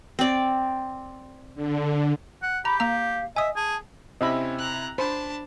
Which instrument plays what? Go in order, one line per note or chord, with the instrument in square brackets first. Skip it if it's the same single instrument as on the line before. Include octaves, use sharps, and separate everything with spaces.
[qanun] C4 D5
[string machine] D3
[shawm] F#5
[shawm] G4 [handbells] A#5 [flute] B5
[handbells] A#3 A#5 [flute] F5
[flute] D#5 [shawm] E5 [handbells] G#5 D#6
[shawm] G#4 [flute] A5
[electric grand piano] C3 C4 E4 [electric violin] C#4 [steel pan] D#5 E5 B5
[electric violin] A#5 F#6
[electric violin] D4 A5 [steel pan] C5 [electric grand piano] B5